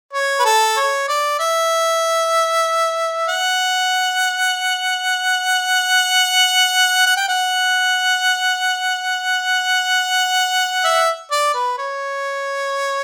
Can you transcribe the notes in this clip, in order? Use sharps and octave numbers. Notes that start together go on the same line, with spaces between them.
C#5
B4
A4
C#5
D5
E5
F#5
F#5
G5
F#5
E5
D5
B4
C#5